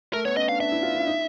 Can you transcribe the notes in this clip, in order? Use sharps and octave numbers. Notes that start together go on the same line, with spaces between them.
A3 A#4
B3 C#5
C#4 D#5
D4 F5
D4 E5
E4
F4
E4
D#4